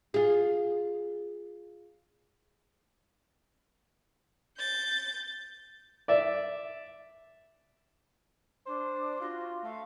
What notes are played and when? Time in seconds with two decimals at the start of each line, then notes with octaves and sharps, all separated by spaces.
0.14 F4 G#4
4.58 G6 A6
6.08 D5 E5
8.66 D4 C5
9.21 F4 F#4
9.64 A3 F5